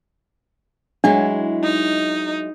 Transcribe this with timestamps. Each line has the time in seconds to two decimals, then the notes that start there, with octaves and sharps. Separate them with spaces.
1.04 F#3 G#3 D4 E4
1.63 D#4